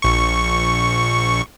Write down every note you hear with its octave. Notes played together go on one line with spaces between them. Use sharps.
A#1 C#6